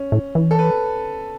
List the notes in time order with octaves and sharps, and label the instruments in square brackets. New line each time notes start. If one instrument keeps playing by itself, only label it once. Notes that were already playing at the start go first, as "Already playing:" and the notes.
Already playing: [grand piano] C#4
[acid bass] A2
E3
[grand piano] A4
B4